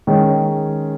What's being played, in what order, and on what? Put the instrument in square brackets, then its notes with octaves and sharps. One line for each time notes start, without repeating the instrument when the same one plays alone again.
[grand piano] D#3 G#3 C#4